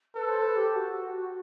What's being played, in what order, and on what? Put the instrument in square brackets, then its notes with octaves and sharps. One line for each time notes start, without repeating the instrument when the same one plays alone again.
[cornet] A4 [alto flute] B4
[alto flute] C5
B4
G4
F#4